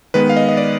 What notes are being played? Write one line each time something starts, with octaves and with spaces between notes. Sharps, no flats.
D#3 G#3 B3 B4
F5
D#5
D#5
D5